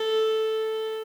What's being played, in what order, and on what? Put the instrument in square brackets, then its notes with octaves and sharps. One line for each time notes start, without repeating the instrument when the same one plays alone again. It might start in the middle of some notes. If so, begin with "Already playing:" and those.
Already playing: [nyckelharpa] A4